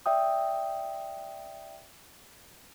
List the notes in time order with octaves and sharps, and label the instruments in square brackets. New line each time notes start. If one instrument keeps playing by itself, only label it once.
[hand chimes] D5 E5 G5 D#6